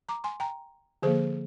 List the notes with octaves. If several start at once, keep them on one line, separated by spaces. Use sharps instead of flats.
A#5 D6
G#5 C6
G5 A#5
D3 F3 A#3 G#4 C5